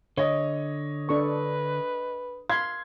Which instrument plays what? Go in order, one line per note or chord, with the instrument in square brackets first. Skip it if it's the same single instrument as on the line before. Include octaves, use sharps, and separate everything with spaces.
[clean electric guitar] D3 [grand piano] C#5 D#5
[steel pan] D4 A4 C#6 [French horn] B4
[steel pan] F5 B5 C6 [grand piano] G#6